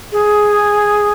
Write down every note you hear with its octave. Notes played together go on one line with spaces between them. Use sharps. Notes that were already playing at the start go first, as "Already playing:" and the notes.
G#4